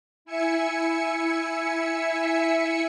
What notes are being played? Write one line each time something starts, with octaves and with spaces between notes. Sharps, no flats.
E4 E5 G#5 E6 C#7